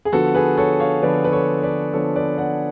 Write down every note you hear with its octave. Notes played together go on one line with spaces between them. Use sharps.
G#4
D3 F3 B3 F#4 A4
G#4 B4
A4 C#5
C#5 F5
D3 F3 B3 B4 D5
B4
A4 C#5
B4 D5
D3 F3 B3 A4 C#5
B4 D5
D5 F#5